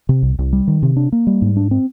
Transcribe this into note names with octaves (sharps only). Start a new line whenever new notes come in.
C3
C2
C2
G3
D#3
C3
D4
A#3
G3
G#2
D4
C4